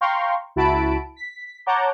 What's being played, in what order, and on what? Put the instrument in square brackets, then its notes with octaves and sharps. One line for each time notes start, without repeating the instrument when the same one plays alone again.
[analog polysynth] F5 G5 A#5 C6 C#6
C#2 E4 F#4 A5 B5 D7
B6
C#5 F#5 A5 A#5 D6 G6